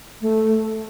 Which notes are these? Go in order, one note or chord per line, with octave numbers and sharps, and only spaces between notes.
A3